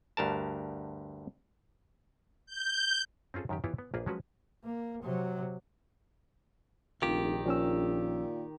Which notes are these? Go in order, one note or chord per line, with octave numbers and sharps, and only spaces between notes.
D2 G2 A#4 A5
G6
C4 C#4 F4 G#4 A4
F#2 D#3 G4
E3 B3 E4 F4 G4 C#5
B3
A#1 A#3 F4 G#4 A#4 B4
F3 F#3 G#3 C#4 F#4 B4
A#3
C3 F#3
F1 A#1 D#3 F4 G4
A#2 F3 C#4 E6